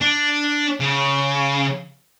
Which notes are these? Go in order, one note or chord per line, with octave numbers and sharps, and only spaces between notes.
D4
C#3